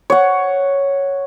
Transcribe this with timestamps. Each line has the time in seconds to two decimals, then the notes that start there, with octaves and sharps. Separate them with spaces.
0.10 C#5 F#5